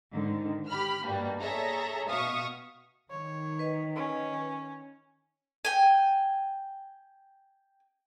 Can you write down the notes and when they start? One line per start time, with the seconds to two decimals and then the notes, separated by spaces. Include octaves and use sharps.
0.10 G#2 D3 D#3
0.68 G4 B5 F6
1.05 G2 B2 G3 A#3
1.40 G#4 A4 C#5 E5 A#5
2.09 B2 E5 F5 C#6 D#6
3.10 D#3 C#5
3.59 B4 D#5
3.96 C#4
5.65 G5 G#5